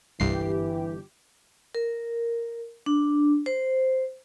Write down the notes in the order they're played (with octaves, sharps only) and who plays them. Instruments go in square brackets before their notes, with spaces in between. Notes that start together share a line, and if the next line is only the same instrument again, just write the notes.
[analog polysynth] G1 G4 [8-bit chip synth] C2 G2 C7 [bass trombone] E3
[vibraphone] A#4
D4
C5